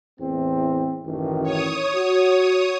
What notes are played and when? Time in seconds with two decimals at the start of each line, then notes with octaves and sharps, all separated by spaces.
0.20 E2 A2 C4
1.05 A1 F#2 D#3
1.43 C#5 D#6
1.95 F#4